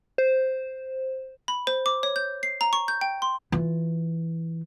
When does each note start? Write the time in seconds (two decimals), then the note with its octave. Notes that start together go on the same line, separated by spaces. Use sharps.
0.18 C5
1.48 B5
1.67 C5
1.86 D6
2.03 C#5
2.16 G6
2.43 C7
2.61 A#5
2.73 C#6
2.88 G6
3.01 G5
3.22 C6
3.52 E3 F4